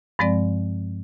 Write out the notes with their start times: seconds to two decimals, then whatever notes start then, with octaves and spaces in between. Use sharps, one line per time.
0.19 G2 F3 G#3 C4 D5